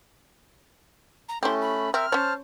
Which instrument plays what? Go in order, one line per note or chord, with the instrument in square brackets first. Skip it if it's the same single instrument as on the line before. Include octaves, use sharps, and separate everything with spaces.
[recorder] A#5
[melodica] A3 C#4 [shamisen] E4 G4 [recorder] C6
[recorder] B5
[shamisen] C4 [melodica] A#4 E5 [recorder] F6
[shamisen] C#4 C#5 [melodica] C5 A5